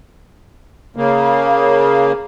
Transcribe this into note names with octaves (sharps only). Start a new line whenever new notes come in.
C#3 A#3